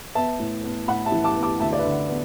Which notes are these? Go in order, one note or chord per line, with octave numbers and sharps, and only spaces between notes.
B3 E5 A5
A2
B3
A2 F#5 B5
E5 A5
E3
A5 D6
B3
A5 D6
D2 E5 A5
D5
B4 E5
D3
B3